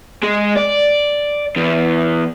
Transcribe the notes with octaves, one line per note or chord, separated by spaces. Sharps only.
G#3
D5
E2